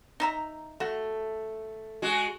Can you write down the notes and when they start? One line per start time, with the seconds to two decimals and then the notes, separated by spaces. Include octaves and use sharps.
0.20 D#4 E5 A#5
0.80 A3 F#4
2.02 G#3 F#4